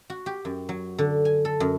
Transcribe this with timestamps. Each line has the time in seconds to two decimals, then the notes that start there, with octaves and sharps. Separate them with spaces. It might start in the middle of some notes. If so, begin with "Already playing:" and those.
0.10 F#4
0.26 G4
0.45 F#2
0.69 F#3
0.98 D3
1.25 G#5
1.45 A4
1.60 F#2